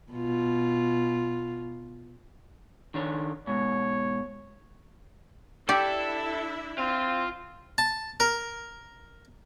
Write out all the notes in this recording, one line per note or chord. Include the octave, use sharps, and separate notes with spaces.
B2 F4
D#3 D4 C#5
G#2 B2 C#5
D4 E4 G4 A4 D5 E5
C4 F4
A5
A#4